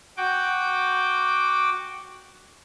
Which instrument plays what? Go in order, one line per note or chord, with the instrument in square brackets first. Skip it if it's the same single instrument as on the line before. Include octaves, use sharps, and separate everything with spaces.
[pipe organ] F#4 G5 D6